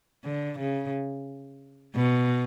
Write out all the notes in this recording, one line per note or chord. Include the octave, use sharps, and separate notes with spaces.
D3
C#3
B2